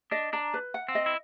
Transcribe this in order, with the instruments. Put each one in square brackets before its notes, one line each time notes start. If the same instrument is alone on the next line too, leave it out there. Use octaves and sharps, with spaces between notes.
[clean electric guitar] D4 [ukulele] D#5
[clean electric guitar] D4 [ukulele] A#5
[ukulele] B4
F#5
[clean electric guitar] C4
[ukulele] D#5
[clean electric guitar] E4